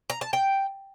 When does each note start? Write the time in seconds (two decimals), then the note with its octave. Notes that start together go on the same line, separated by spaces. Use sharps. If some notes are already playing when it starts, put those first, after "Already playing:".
0.10 A#5
0.21 A5
0.33 G5